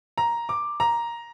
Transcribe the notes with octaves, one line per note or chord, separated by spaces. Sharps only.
A#5
D6
A#5